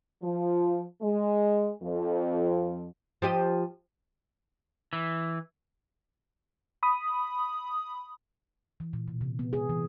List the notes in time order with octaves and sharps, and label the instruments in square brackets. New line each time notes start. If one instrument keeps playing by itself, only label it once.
[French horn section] F3
G#3
F2
[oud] F3 G4 D#5
[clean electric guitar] E3
[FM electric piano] B5 D#6
[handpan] E3
A#2
B2
C3
B3
G#4
E3